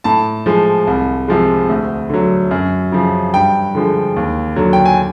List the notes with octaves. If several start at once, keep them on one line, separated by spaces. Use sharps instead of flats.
A2 A5
F3 G#3
C2
C3 F3 G#3
D2
D3 F#3
F#2
C#3 F3
G2 G5
D3 F3 G#3
D#2
D3 F#3
G5
G#5